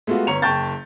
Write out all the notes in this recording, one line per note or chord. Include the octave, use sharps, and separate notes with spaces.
G#3 A3 B3 F4 F#4
G1 C#5 A#5 C#7 F7
F#1 G5 A5 C#6 G6 A6